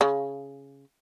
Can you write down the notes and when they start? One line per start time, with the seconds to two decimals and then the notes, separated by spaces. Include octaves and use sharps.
0.01 C#3